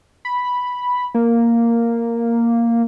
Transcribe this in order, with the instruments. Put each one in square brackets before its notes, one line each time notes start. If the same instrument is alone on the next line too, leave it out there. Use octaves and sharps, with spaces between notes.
[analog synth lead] B5
A#3